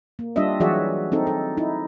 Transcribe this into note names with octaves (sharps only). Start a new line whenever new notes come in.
A#3
G3 D4 F4 D#5 E5
E3 F#3 F#4 G#4 D5 E5
C4 D#4 A4
A4
D#4 E4